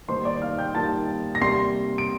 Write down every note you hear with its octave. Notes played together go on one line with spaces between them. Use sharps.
D#3 G3 A#3 D#4 C5 C6
D5 D6
F5 F6
G5 G6
D#3 G3 A#3 D#4 A5 A6
A#6
C3 G3 A#3 C6 C7
D7